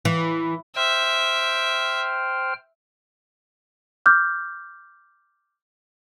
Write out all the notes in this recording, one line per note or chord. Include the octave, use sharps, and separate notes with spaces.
E3
C5 E5 G5 F6
D6 F6 G6